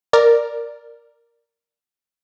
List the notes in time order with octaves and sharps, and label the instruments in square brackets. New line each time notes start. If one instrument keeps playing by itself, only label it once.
[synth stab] A#4 D5